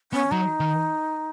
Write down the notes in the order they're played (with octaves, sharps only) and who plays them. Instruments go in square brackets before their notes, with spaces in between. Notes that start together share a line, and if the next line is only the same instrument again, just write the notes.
[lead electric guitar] B3 [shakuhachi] C#4
[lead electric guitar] F#3 [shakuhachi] D#4
[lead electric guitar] D#3